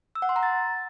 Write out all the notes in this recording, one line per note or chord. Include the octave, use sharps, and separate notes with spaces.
E6
F#5
C6
A#5
A6